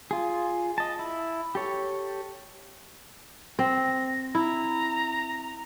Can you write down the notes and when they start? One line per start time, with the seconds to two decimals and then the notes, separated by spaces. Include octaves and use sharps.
0.11 F4 G#4
0.78 D#5 A5
0.99 E4
1.55 G4 A4 C#5
3.59 C4 A#6
4.35 E4 A#5